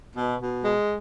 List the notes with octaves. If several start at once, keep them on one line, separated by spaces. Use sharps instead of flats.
B2
B2
G#3